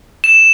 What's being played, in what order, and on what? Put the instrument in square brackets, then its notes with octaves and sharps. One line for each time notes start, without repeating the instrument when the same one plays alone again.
[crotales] E7